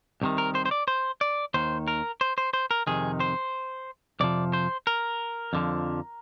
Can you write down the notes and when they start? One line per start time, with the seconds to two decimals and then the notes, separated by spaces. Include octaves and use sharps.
0.21 C2 C3 D#3
0.38 A#4
0.55 C5
0.66 C5
0.71 D5
0.88 C5
1.21 D5
1.54 D#2 D#3 C5
1.88 A#4
2.21 C5
2.38 C5
2.53 C5
2.71 A#4
2.87 F2 C3 D#3 G#4
3.20 C5
4.20 F2 C3 F3 D5
4.53 C5
4.87 A#4
5.53 F2 D3 F3